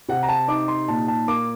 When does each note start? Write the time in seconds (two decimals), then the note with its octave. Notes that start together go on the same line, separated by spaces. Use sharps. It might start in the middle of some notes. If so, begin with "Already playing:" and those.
0.09 C3 F#5
0.23 A#5
0.29 A5
0.48 D#4 D6
0.68 C6
0.88 A#2 A5
1.08 A5
1.28 A#3 D6